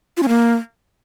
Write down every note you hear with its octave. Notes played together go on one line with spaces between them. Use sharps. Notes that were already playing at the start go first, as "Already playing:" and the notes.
F4
C#4
A#3